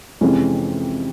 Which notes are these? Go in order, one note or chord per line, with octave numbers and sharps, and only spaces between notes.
F2 C3 E3 G#3 C#4